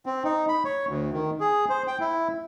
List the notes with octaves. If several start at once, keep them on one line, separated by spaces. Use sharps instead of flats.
C4
D#4
B5
C#5
D2
D#3
G#4
C5
G5
E4